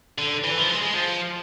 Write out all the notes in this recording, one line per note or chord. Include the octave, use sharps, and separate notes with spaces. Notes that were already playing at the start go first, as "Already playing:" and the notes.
D3
E3
F3
G#3
G#3
F3